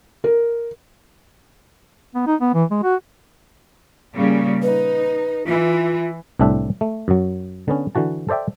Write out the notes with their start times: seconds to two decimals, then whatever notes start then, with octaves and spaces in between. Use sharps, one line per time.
0.24 A#4
2.15 B3
2.27 D#4
2.41 B3
2.54 E3
2.71 G#3
2.83 F#4
4.15 A#2 C#3 G3
4.63 D#4 B4
5.46 E3 F4
6.39 C2 A2 C4 D4 A4 E5
6.81 A3
7.08 F#2 F#3
7.68 D3 B3 C#4
7.95 D3 E3 F#4 A5
8.29 A4 C5 D5 E5 G5